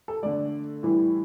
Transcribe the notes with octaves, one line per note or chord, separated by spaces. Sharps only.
A4
D3 A3 D5
A2 E3 G3